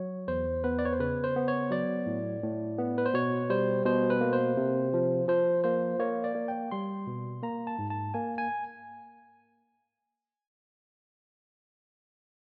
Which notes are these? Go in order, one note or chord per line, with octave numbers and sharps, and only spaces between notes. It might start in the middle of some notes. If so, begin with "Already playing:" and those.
Already playing: F#3 C#5
E2 C5
B3 B4
D5
C#5
C5
C#3 B4
C5
B3
C#5
F#3 D5
A2
A2
B3
B4
C5
B2 C#5
G3 C5
B2 C5
B4
A#3
C5
C3
F3
F3 C5
A#3 C5
A#3 C#5
D5
A#3
G5
G3 C6
B2
A#3 A#5
A5
G#2
A5
A#3 G#5
G#5